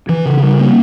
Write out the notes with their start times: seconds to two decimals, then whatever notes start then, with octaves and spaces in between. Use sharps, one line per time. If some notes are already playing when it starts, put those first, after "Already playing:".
0.09 E3
0.25 C#3
0.43 G3
0.59 A#3